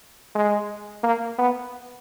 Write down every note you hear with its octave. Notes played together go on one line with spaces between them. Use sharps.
G#3
A#3
B3